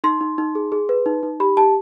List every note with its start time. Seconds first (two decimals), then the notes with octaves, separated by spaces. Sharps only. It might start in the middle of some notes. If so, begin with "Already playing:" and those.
0.04 D#4 C6
0.21 D#4
0.38 D#4
0.55 G#4
0.72 G#4
0.89 B4
1.06 D#4
1.23 D#4
1.40 G4 B5
1.57 G4 A5